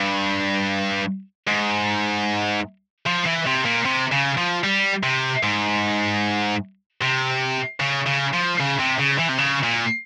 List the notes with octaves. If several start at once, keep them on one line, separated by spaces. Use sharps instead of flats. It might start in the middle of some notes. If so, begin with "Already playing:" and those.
Already playing: G2
G#2
F3
E3
C3
A#2
C3
C#3
F3
G3
C3
G#2
C3
C#3
C#3
F3
C#3
C3
C#3
E3
C3
C#3
A#2